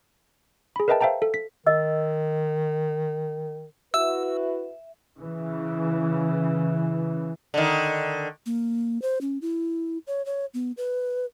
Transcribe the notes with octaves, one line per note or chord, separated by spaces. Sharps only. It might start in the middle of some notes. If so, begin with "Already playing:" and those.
G#4 B5
A#4 B4 D#5 E5 G5 A5
C5 E5 F5 G5 A5 A#5
A4
B6
D#3 D#5 E6
E4 F#4 B4 E5 E6
C#3 E3
D3 D#3
A#3
C5
C#4
E4
C#5
C#5
B3
B4